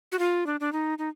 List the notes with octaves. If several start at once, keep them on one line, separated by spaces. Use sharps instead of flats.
F#4
F4
D4
D4
D#4
D#4